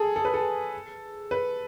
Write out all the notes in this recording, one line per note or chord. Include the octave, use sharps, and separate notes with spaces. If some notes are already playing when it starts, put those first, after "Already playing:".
Already playing: G#4 A4
A4
B4
A4
B4